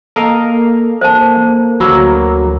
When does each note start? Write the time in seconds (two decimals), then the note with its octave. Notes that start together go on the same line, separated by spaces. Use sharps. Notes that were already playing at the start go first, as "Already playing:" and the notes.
0.16 A#3 A4 A#4 D#5 F5
1.01 C5 A5
1.80 D2 F#3 A#3 F#4 B5 E6